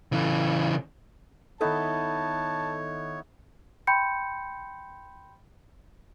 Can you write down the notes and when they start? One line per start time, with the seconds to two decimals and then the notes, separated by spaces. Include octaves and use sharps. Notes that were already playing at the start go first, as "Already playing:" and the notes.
0.12 C#3 E3
1.61 D#3 B3 D#4 E4 A4 C#5 A5
3.87 G5 B5 C6 G6 C#7